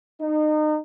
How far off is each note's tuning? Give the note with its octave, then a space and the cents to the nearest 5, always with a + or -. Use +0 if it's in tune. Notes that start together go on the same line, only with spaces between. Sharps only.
D#4 -30